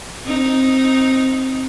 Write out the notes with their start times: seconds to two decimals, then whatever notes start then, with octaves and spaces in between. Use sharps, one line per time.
0.24 C4 D#4